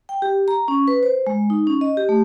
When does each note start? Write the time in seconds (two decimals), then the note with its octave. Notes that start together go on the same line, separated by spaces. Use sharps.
0.09 G5
0.22 G4
0.48 A#5
0.68 C#4
0.88 B4
1.03 C5
1.27 G#3
1.50 D#4
1.67 C#4
1.81 D#5
1.97 G4
2.09 A3